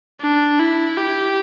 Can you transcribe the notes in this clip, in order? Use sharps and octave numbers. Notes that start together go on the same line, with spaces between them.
D4
E4
G4